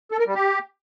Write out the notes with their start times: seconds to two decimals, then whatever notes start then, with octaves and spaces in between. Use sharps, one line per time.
0.11 A4
0.19 A#4
0.27 G3
0.35 G4